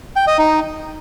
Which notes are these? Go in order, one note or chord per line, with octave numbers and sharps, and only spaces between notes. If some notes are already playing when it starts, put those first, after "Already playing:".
G5
D#5
D#4